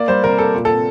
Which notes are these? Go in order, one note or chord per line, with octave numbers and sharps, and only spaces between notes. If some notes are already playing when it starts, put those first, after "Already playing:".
Already playing: A#3 D5
G3 C5
C3 A#4
A#3 A4
A#2
C4 A4